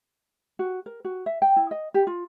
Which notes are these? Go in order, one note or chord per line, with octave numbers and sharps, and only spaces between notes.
F#4
A#4
F#4
E5
G5
E4
D#5
G4
F4